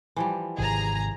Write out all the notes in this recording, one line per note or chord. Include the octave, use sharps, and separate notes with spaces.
E3 F3 G3
G#1 C3 G#4 A#5